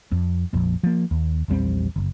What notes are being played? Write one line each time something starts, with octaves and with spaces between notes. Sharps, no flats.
F2
A#1 F2
F3 A#3
D#2
A#1 E2 G3 C4
F#1